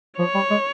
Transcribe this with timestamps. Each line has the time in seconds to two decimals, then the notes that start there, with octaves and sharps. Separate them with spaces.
0.18 F3 C#5
0.34 G3
0.50 G#3